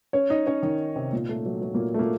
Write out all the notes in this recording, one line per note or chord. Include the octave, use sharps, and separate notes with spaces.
C#4 C#5
D#4 D#5
C#4 C#5
D#3 D#4
C3 C4
A#2 A#3
A3
F#3
F#3
A#2 A#3
A3
A#2 A#3